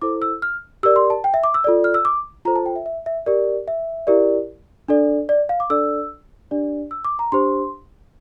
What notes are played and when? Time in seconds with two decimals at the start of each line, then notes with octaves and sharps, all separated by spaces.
0.02 E4 A4 C5 D6
0.22 E6
0.42 F6
0.83 G4 A#4 D5 E6
0.96 C6
1.10 A5
1.24 G5
1.34 E5
1.44 D6
1.54 E6
1.64 F4 A4 D5
1.84 F6
1.94 E6
2.05 D6
2.45 F4 A4 C5 A#5
2.56 A5
2.66 G5
2.76 E5
2.86 E5
3.06 E5
3.26 G4 A#4 D5
3.68 E5
4.07 E4 G4 A#4 D5
4.88 D4 A4 D5
5.29 D5
5.49 F5
5.60 D6
5.70 D4 A4 D5 E6
6.51 D4 G4 D5
6.91 E6
7.05 D6
7.19 A#5
7.32 D4 G4 C5 C6